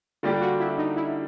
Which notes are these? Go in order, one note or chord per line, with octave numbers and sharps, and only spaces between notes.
D3 G3 A#3 D4 F4 G4
F#4
E4
D#4
E4